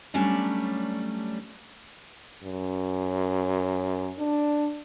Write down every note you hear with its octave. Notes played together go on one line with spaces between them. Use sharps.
F#3 G3 A3 C#4 D4
F#2
D4